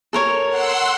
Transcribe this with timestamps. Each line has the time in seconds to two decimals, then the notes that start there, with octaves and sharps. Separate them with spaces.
0.13 A4 A#4 C#5
0.48 F#5 C6 E6